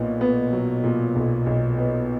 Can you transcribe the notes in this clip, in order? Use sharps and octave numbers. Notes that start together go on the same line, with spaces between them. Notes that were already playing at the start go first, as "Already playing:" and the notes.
Already playing: B1 A#2 B3
B3
F#3
A#2
B1
B1
B3